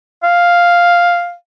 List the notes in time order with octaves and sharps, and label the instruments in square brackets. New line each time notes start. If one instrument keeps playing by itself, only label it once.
[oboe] F5